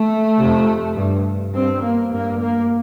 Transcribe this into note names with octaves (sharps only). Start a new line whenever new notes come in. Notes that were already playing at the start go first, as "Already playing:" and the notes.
Already playing: A3
F2 C3
G2
G2 C4
A#3
G2 A#3
A#3